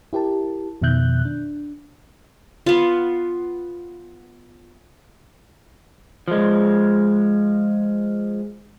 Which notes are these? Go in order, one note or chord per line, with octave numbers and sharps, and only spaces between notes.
E4 G4 A#4 A5
F2 B2 D#3 E5 F#6 G6
D4
B3 F4
F3 G#3